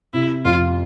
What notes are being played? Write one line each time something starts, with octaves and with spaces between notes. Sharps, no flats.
C3 E4
F2 F4